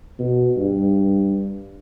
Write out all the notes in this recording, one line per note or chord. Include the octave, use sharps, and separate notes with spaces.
B2
G2